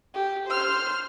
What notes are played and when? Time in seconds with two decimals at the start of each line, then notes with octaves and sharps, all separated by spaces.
0.14 G4
0.48 C5 F6